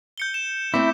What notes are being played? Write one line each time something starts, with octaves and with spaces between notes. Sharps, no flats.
G6 C#7 G7
E7
A3 C4 E4 E5 D6